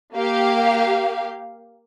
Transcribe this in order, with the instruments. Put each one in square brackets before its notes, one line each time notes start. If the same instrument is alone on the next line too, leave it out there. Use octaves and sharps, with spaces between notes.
[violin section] A#3 G4 F5